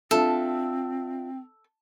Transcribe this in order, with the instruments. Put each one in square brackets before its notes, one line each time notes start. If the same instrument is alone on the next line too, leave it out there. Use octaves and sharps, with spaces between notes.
[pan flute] C4 [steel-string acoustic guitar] D4 F4 E5 [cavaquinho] A4